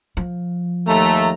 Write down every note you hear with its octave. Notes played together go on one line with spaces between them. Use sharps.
F3
D#2 A3 A#5